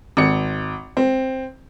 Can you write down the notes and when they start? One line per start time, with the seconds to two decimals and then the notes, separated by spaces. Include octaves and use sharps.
0.17 G#1 C#7
0.97 C4